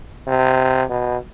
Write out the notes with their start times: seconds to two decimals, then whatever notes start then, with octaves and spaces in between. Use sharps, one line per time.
0.28 C3
0.89 B2